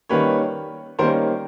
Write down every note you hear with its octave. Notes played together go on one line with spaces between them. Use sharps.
D#3 G3 A#3 C#4 B4 C#5
D#3 G3 A#3 C#4 A#4 C5